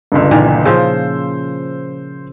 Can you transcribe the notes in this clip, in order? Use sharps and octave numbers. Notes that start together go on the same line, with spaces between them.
G1 C#2 G2
A#2 D#3 E3
C#3 F3 C5 E6